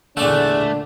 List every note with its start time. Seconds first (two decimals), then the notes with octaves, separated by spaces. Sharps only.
0.17 E2 A#2 D3 A3 D4 D5 F#5